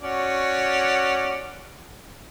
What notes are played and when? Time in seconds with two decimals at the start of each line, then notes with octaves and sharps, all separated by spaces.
0.01 C#4 F#4 D5